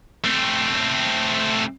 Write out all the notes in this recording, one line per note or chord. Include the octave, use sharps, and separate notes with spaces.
A3 C4